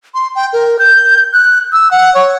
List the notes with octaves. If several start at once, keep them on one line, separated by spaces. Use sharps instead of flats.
C6
G5
A#4
G6
F#6
E6
F#5
C#5